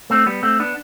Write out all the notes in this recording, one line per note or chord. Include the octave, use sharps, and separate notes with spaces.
A3 C4
G3 B3
A3 C4
B3 D4